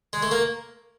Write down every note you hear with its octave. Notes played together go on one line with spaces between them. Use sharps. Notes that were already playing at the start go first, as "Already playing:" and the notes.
G#3
A3
A#3